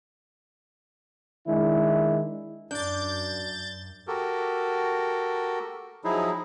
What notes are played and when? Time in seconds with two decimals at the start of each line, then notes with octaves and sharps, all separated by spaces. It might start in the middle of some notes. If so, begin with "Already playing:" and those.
1.48 D#3 G#3 D4 E4
2.71 F#2 D4 G6 A6
4.07 F#4 G4 A4 A#4
6.04 F3 F#3 D#4 E4 G#4